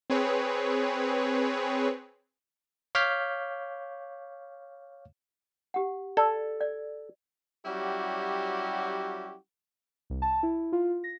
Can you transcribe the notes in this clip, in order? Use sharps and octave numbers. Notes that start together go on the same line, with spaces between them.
C4 G#4 B4 C#5
C#5 F5 D6 F6 G6 B6
G4 F#5
A4 D5
D5
F#3 G3 C#4 E4 F#4 G4
C2
A5
E4
F4
A#6